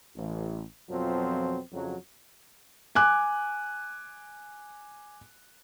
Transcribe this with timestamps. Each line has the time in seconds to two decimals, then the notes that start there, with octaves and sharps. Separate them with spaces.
0.16 A1
0.89 F2 B2 F3 F#3 C4
1.72 F2 C#3 F#3
2.95 G#5 D6 F#6